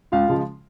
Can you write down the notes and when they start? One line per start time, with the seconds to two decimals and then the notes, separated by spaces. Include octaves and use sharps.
0.12 C#2 F4 F5
0.29 C#3 F3 G#3